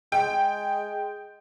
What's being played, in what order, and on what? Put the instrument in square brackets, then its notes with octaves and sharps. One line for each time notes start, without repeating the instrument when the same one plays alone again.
[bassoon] G#3 [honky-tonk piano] G5